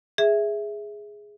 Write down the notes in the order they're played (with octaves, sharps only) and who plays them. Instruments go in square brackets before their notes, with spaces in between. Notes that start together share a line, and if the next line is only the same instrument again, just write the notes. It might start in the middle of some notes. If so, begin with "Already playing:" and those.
[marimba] G#4 E5